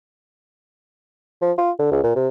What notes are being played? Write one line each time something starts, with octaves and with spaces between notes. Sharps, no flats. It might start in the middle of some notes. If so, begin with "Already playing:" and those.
F3
F4
D3
C#2
A#2
C3